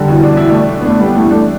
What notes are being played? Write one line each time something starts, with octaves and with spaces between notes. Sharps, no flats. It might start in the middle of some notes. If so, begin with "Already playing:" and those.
Already playing: D3 G3
B2 E3
D4
E4
A3 D4
B3
A3 D4
G3 B3
E3 A3
A3 D4